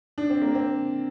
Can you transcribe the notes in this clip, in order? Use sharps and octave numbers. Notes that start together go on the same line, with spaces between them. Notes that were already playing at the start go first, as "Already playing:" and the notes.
D4
C4
A#3
C4